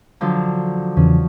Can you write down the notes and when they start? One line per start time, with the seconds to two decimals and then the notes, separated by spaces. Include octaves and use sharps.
0.21 D3 F3 F#3
0.97 E2 C#3 E3 C#4